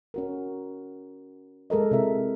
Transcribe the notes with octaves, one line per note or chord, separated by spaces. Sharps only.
C#4 F#4 A#4
G#3 A4 A#4 D#5
C3 E4 A#4 E5